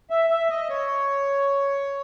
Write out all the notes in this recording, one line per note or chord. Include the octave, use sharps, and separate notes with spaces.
E5
E5
D#5
C#5